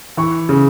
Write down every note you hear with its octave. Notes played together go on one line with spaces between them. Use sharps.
E3 C#6
C#3